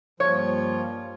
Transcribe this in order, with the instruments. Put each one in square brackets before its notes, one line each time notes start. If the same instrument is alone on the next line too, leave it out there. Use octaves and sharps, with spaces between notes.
[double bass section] G2 G3 A#3 [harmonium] F3 F4 [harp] C#5